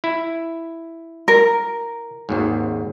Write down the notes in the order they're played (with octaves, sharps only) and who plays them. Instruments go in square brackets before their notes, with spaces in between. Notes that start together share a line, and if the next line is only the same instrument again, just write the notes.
[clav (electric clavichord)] E4
[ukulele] A#4
[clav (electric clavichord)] G#1 D#2 G#2